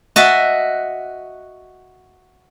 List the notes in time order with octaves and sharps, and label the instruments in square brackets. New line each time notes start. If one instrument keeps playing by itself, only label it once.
[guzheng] F#4 D#5 E5 A5